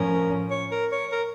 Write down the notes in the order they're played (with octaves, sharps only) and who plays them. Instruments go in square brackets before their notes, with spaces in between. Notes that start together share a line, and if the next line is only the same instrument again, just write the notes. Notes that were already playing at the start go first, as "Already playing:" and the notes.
Already playing: [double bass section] A2 F3 C#4 [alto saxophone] A#4
[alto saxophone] C#5
A#4
C#5
A#4